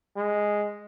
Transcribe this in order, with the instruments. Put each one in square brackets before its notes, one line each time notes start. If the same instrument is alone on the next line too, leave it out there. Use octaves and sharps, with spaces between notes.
[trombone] G#3